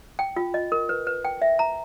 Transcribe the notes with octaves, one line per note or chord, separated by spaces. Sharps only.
G5
F4
D#5
A#4
B4
B4
G5
E5
A#5